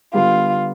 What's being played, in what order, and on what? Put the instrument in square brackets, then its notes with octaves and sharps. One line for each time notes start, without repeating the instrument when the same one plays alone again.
[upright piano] D3 G3 B3 [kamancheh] F4